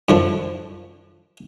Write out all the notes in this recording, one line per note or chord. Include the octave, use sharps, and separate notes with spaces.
F#2 D3 F3